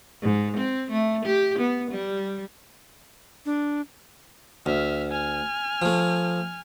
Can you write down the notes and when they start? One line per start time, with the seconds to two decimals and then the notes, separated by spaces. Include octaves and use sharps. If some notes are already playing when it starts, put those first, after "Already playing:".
0.22 G#2
0.57 C4
0.91 A3
1.25 G4
1.59 B3
1.92 G3
3.46 D4
4.66 D2 E5 F6
5.11 G#5 F6
5.82 F3 A3